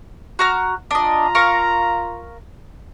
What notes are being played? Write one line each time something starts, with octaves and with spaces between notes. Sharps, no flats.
F#4 A#5 F6
D4 F4 D#5 A#5
A#4 F5 C#6